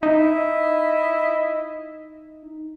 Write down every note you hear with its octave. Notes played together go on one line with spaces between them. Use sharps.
D#4 E4 D#5